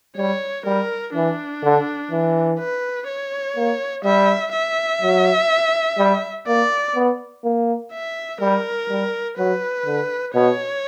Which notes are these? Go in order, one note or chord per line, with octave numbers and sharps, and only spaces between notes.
G3 C#5
G3 A#4
E3 D4
D3
E3
B4
C#5
A#3
G3 E5
E5
F#3
G3
A#3 D5
B3
A#3
E5
G3 A#4
G3
F#3 B4
D3
B2 C#5